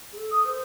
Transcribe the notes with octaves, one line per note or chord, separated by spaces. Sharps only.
G#4
A4
D#6
C5